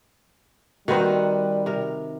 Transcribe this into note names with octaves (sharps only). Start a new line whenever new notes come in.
D#3 G3 C4 D#4 F#4 B4
C3 A#4